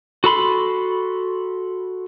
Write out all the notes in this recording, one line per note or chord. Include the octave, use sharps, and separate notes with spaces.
F#4 A4 B5 C6